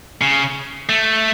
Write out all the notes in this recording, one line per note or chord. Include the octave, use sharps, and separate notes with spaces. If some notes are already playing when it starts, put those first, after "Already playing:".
C#3
A3